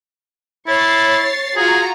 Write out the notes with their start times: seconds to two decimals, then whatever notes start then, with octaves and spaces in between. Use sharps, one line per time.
0.68 E4 C#5 A6 C7
1.57 F4 F#4 G#4 A#5